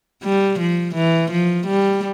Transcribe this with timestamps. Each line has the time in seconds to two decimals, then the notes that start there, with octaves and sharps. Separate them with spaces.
0.23 G3
0.59 F3
0.94 E3
1.31 F3
1.66 G3